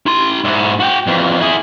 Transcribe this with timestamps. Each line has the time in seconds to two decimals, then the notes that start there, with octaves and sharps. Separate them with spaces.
0.06 E4 C6
0.44 G#2 E4
0.80 F#4 G5
1.07 F2 E3
1.41 E4 G#4